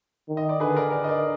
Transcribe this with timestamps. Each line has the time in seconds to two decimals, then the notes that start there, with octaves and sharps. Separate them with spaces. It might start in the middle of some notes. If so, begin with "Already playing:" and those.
0.29 D#3
0.37 D#5
0.49 D5
0.60 D3 G#4 B4
0.76 A#4 D5
0.92 A#4 D5
1.04 D#5
1.09 A#4 D5